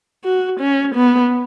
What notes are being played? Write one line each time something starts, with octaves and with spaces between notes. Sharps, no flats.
F#4
C#4
B3